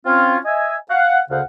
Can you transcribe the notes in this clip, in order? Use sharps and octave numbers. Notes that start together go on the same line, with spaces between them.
C4 C#4 F4
D#5 E5 G#5
F5 F#5
D2 C#3 C5 F5 F#5